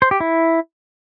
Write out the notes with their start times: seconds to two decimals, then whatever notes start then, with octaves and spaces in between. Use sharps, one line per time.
0.02 C5
0.11 G4
0.20 E4